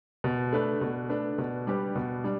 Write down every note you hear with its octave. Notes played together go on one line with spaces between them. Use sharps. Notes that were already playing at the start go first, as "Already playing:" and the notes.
B2
A3 D4 B4
B2
A3 D4 B4
B2
G3 D4 G4 B4
B2
G3 D4